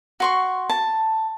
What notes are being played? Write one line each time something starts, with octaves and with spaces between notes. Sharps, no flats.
F#4 C6 C#6
A5